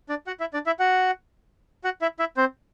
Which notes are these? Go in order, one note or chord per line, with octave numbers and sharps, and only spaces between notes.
D4 D5
F#4 F#5
E4 E5
D4 D5
E4 E5
F#4 F#5
F#4 F#5
E4 E5
E4 E5
C4 C5